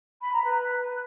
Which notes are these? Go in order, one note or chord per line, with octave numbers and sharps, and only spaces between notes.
B5
A#5
B4